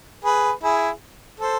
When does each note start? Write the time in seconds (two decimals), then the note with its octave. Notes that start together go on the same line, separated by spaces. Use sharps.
0.24 G#4 B4
0.63 E4 G#4
1.40 A4 C5